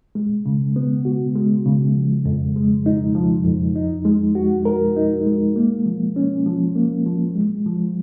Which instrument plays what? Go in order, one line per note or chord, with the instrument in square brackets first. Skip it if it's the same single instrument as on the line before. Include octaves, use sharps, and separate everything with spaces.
[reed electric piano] G#3
C#3
B3
F#4
G#3
C#3
F3
F2
G#3
D#4
F3
F2
D#4
G#3
F#4
A#4
D#4
G#3
A#3
F3
C#4
F3
A#3
F3
G#3
F3